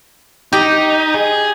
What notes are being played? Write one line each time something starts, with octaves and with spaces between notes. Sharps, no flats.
D#4 G4
G#4